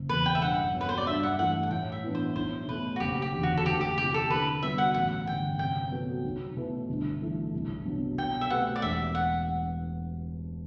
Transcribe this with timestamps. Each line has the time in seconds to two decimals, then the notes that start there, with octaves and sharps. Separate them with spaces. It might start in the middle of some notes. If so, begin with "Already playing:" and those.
Already playing: F#1
0.09 E2 B2 B4
0.26 G5
0.35 E5
0.41 G2 F#5
0.74 F#3 B3
0.81 B4
0.89 C5
0.98 D5
1.06 G2 E5
1.23 F#5
1.39 E3 A3 F#5
1.63 F#5
1.71 A2 G5
1.92 E5
2.04 E3 B3 D4
2.15 C5
2.36 B1 C5
2.68 B2 A3 B4
2.96 F#4
3.00 F#1 G4
3.22 G4
3.33 E2 D3
3.43 F#4
3.57 A4
3.65 D2 G4
3.81 G4
3.97 C3 E3 G4
4.14 A4
4.30 D3 B4
4.62 G3 B3 F#4 B4 E5
4.78 F#5
4.94 A1 F#5
5.27 G2 D3 G5
5.59 C3 G5
5.91 F#3 B3 F#4 A4
6.24 B1
6.57 B2 A3 E4 B4
6.89 G1
7.21 G2 E3 A3
7.53 C2
7.85 B2 F#3 B3 D4
8.18 B2 G5
8.41 E5
8.50 A3 C4 G4 B4 F#5
8.76 D5
8.82 E1 E5
9.15 F#5